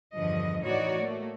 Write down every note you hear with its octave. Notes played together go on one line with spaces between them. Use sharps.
E2 G2 D3 F3 D#5
A2 E3 D#4 F#4 C#5 D5
A3 A#3